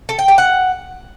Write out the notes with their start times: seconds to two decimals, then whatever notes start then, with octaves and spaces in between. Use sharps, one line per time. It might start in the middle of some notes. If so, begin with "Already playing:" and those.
0.09 A4
0.19 G5
0.28 G4
0.38 F#5